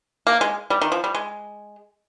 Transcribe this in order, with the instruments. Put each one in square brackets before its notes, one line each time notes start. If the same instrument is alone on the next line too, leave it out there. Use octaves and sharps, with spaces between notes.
[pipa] A#3
G#3
G3
D#3
F3
G3
G#3